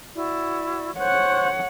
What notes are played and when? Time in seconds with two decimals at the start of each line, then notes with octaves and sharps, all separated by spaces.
0.15 E4 F#4 D5
0.99 C5 C#5 F#5 C#6 F#6